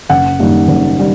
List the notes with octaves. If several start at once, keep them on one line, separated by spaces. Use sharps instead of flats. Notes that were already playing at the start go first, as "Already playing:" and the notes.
F#1 F#5
F#2 D#3 G3 A#3
F#1
D#3 G3